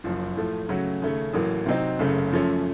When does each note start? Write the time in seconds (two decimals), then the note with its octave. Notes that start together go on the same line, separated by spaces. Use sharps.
0.04 F#1 F#2 F3
0.37 A2 F3 A3
0.68 C#3 F#3 A3 C#4 F#4
1.02 D#2 C#3 A3 C#4
1.34 A1 A2 F#3 A#3
1.66 C3 F#3 C4 D#4
1.99 F#1 F#2 C#3 A3
2.32 F#2 F3 A3 C#4